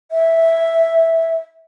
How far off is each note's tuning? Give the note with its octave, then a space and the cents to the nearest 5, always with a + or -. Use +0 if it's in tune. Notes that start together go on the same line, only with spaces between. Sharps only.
E5 -5